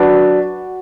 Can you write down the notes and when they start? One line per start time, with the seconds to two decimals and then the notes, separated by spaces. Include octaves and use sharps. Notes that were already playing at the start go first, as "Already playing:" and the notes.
Already playing: F#3 D4 F#4 B4